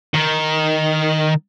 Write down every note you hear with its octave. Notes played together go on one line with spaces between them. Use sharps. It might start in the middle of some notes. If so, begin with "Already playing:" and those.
D#3